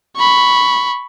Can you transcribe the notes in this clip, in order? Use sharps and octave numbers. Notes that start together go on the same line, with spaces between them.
B5 C#6